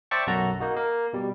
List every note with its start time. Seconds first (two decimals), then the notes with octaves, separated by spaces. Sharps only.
0.11 C5 D5 E5 G5 A5 C#6
0.27 B1 F#2 F#4 A4 A#5
0.60 A#3 D#4 F#4
0.77 A#3
1.13 B2 G3